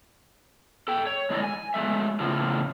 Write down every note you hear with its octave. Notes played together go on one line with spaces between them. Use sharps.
A4 G5
C#5
G#3 A3 E4 A4 D5 D#5
G#5
F#3 G#3 A3 E5
A2 C#3 F3 F4